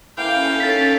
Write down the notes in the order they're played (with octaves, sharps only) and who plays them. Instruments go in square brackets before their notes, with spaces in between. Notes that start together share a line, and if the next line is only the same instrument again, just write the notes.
[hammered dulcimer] E3 A#3 [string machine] C#4 A4 [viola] F5 G5
[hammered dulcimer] D#4 A#4 [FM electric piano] A6 B6